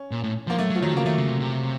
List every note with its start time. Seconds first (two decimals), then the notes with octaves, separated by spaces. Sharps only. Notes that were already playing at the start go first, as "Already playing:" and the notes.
Already playing: C#4
0.11 A#2
0.24 A2
0.47 F3 A#3
0.59 F#3 A3
0.70 F#3
0.75 F3
0.82 D#3 F#3
0.93 C#3
0.97 A#3
1.06 D#3 A3
1.18 C#3
1.29 C3
1.40 C3